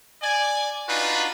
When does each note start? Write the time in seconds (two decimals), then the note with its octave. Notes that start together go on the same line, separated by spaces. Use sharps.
0.23 D5 G#5
0.88 D4 D#4 F4 F#4 B4